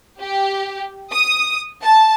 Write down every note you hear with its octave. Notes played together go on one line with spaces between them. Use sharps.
G4
D#6
A5